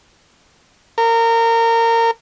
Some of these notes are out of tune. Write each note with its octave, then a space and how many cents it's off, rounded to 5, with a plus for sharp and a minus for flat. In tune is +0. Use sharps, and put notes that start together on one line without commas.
A#4 -25